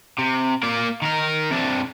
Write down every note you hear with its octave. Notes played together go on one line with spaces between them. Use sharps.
C3
A#3 D5
D#3 A#4
C3 D4